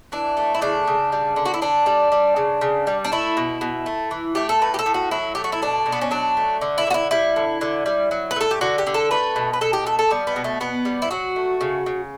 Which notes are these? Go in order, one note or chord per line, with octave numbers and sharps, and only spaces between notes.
E3 D4
A3
E4
C#3 D4
C#3
G3
D3
F#4
E4
D3 D4
G3
G3
C#3
C#3
G3
D4
A3 E4
B2
B2
A3
E3
A3 G4
A4
A2 B4
G4
A4
A2
F#4
F#3 E4
A3 G4
F#4
E4
B2 D4
B2
B3
C#4
F#3 D4
A3
D3
E4
D3 F#4
E4
G3 E4
D3
D3
G3
F#3
B4
A3 A4
G4
D3 F#4
G4
D3
A4
A3 B4
B2
B4
B2 A4
G4
A3 A4
A4
G3 B3
B3
B2
A3
B2 B3
G3
E4
F#3 F#4
A3
C#3
C#3